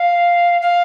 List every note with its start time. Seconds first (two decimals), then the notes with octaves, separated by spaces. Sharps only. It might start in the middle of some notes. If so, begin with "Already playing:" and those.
Already playing: F5
0.62 F5